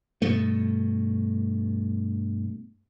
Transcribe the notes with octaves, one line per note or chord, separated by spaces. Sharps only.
G2 B2 A3